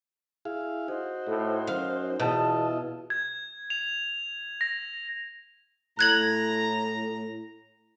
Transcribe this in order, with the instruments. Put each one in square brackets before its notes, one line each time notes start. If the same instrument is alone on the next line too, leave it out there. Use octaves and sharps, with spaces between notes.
[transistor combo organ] E4 G#4 F5
[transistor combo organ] D#4 F#4 [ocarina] C5
[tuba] A2
[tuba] F#2 [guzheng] F5
[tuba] E2 [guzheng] B2 [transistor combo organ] E4 F4 D#5 [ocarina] A5
[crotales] G#6
F7
A#6
[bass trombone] A2 [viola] A#5 [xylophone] F#6 G#6 F#7